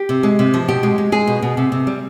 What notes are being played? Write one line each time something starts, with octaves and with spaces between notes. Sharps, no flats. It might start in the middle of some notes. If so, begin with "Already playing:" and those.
Already playing: G4
C3
G#3
C3
F3
B2 G4
G#3
G#3
G#3 G#4
B2
B2
C3
C3
G3